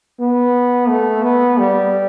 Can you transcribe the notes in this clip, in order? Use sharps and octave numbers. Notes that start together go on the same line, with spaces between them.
B3
A3
B3
G3